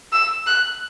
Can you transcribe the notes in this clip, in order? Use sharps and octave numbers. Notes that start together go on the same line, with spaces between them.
E6
F#6